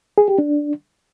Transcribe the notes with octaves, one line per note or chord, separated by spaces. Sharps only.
G#4
G4
D4